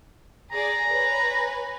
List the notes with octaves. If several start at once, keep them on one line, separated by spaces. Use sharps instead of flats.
G#4 D5 A#5
B4 C#5 G#5